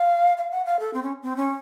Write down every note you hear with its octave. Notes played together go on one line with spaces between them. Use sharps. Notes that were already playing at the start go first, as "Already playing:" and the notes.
Already playing: F5
F5
F#5
F5
A4
C4
C#4
C4
C#4